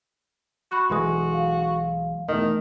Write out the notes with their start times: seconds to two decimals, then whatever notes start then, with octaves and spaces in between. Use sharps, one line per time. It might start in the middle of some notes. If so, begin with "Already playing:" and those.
0.72 F#4 B5 C#6 F#6
0.90 B1 E3 G#3 C6 D#6
1.33 F5
2.28 E1 E2 D#3 A3 D#5